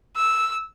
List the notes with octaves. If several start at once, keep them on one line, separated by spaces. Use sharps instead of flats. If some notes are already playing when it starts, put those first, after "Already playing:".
E6